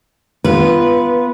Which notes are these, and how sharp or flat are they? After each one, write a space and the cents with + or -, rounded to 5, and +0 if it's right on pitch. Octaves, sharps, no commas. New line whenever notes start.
B3 +0 F4 -25 B4 -15